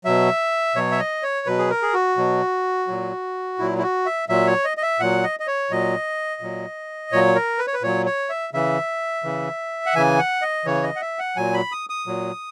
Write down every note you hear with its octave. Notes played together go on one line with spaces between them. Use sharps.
B2 F#3 E5
B2 F#3 C#5
E5
D#5
C#5
B2 F#3 B4
G#4
A#4
G#4
F#4
B2 F#3
A#2 F#3
A#2 F#3 E4
E4
F#4
E5
A#2 F#3 E5
C#5
D#5
D#5
E5
A#2 F#3 F#5
D#5
D#5
C#5
A#2 F#3 D#5
A#2 F#3
A#2 F#3 C#5
A#4
B4
C#5
B4
A#2 F#3 C#5
C#5
E5
C#3 E3 E5
C#3 E3
F#5
C#3 E3 G#5
F#5
D#5
C#3 E3 C#5
D#5
F#5
E5
F#5
A#2 F#3 G#5
B5
D#6
D#6
A#2 F#3